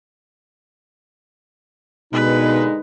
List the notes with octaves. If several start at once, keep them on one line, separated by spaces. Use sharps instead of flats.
D#2 B2 D3 G#3 D#4 B4